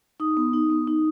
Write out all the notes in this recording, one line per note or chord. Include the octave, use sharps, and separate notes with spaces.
D#4 D#6
B3
D#4
B3
D#4